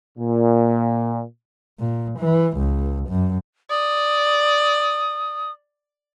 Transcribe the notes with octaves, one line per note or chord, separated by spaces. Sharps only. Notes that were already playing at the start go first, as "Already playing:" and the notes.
A#2
A#2
E3
C#2
F#2
D5 D#6